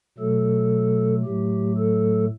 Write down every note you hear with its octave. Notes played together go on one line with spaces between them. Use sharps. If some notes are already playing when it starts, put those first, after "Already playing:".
B2 F#3 A3 A4
A2 F#3 A3 G4
A4